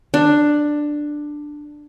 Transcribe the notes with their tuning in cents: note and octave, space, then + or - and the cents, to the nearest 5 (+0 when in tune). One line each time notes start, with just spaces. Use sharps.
D4 +10